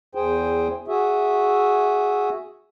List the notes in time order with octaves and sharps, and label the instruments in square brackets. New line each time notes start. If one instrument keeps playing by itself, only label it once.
[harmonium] E2 G#4 C5 G5
F#4 G#4 E5